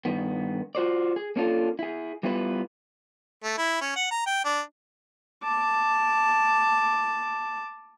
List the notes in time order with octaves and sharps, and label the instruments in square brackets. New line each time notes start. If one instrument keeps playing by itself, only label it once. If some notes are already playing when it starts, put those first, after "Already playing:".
[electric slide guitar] G2 D#3 B3
F4 F#4 C5 D5
G#4
A#3 C#4 D4 F4 A4
E4 G#4
G3 B3 E4 F4 B4
[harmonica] A3
E4
C#4
F#5
A#5
G5
D4
[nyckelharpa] A5 D6